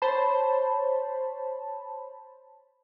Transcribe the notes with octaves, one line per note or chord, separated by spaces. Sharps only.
C5 C#5 A5 B5